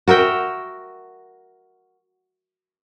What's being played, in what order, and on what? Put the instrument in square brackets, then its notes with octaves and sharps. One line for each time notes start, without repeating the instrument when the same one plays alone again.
[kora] F#4 A#4 E5 G5